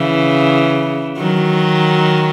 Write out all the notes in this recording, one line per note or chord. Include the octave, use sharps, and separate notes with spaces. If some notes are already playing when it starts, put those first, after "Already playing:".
Already playing: C#3 E3
D#3 F#3